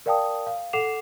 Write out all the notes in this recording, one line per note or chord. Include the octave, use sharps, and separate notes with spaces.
A#4 D5 F5 G5 A5 D#6
F5
A4 F#5 D6 C7 E7 F7